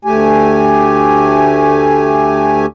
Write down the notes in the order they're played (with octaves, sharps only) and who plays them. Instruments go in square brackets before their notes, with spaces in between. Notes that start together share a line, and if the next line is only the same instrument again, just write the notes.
[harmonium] D2 A3 G4 G#5